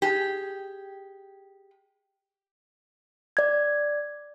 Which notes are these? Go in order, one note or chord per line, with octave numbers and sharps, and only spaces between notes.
G4 G#4
D5 G#6